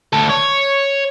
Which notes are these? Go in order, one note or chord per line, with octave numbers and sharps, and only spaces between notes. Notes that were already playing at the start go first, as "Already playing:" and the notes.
D2 A4
C#5